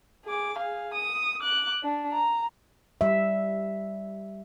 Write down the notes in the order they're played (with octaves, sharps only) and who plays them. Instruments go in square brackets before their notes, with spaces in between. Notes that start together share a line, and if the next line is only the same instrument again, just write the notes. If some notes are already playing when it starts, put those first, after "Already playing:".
[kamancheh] G#4 D6
G#4 F5
D#6
D6 F#6
D4
A#5
[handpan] G3 E5